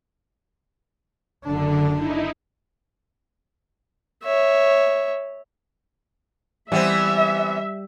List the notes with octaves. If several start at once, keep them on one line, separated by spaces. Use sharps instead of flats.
F#1 D3 D4
D#4 E4
C#5 E5
E3 G3 B3 C4 E5